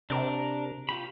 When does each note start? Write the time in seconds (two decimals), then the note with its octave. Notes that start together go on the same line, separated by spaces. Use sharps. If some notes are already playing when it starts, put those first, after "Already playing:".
0.10 C3 D4 A#4
0.89 F4 G4 B5